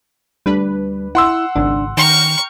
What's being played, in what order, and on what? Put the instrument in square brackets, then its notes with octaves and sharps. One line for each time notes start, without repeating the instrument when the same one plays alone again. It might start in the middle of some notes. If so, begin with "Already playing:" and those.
[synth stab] D2 D4 B4 [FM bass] G3
[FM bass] E4 [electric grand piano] F#5 C6 E6
[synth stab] G#1 C#2 G#2 [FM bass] D4
[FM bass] D#3 [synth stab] G5 A#5 F6 [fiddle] C#6